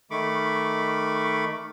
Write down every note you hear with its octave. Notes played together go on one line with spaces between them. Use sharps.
D#3 A3 B5 C#6 D6